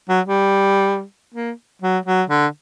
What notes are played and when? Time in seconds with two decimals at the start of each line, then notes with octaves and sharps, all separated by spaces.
0.09 F#3
0.26 G3
1.34 A#3
1.82 F#3
2.06 F#3
2.30 D3